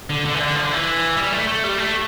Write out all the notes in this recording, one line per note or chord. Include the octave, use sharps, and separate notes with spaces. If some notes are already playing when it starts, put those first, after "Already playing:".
D3
D3
E3
D3
F3
D3
E3
G3
A3
A3
G3
A3